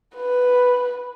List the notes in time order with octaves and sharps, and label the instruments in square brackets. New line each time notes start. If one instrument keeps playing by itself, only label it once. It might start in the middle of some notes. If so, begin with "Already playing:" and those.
[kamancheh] B4